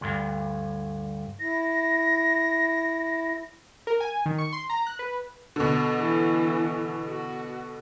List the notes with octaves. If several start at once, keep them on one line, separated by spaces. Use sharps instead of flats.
D2 G2
E4 A#6
A#4
G#5
D#3
C#6
C6
A#5
F#6
B4
B2 D3
E3
F#4